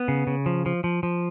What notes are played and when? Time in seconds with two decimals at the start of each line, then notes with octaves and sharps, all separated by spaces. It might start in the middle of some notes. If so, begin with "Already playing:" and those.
Already playing: B3
0.08 C#3
0.27 C#3
0.46 F3
0.66 F3
0.84 F3
1.03 F3